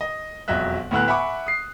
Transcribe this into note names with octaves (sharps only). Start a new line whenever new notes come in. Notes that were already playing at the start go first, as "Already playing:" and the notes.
D#5
E1 F2 F#3 D#5 E5 F#6
D2 A2 B3 E6 F#6
E5 F#5 G#5 B5 C#6 D6
D#6 C7